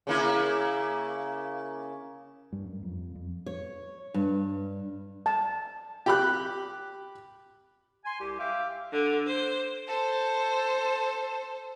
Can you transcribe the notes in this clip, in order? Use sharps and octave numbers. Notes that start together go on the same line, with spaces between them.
C#3 A#3 E4
G2
F#2
F2
F2
C#5
G2
A5
G4 B5 F#6
G#5 C6
C2 G4
E5 F5 G5 D6
D3
C5
A4 C5